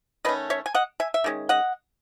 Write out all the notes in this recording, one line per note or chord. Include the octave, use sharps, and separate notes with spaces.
D#3 A3 C#4 B4 D#5
C#5 E5
G#5
D#5 F#5
E5 G#5
E5
D#3 G#3 C#4
D#5 F#5